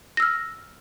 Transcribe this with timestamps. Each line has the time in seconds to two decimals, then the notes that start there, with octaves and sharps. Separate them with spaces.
0.17 A#6
0.20 E6
0.22 F6